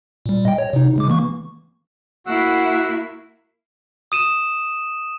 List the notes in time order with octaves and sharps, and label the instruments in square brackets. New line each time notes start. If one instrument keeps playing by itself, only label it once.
[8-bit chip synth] A#2 G3
D#5 G5
C#5
C3 D#4
C#3 G#3 D6
E3 A#3 C#6
[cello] A#3 E4 [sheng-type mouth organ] F#4 F#5 E6
[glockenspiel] D#6 D#7 E7